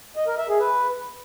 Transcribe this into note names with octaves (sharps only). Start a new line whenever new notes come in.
D#5
A#4
E5
G#4
B4